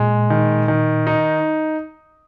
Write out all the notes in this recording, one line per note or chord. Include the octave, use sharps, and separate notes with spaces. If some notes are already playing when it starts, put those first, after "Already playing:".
Already playing: A#2 G#3
D#3
D#3
D#4